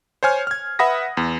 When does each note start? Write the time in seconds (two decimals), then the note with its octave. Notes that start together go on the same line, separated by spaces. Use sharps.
0.23 C5 C#5 G#5 F6
0.47 F6 G#6
0.79 B4 E5 F#5 B5 D#6 A#6
1.17 E2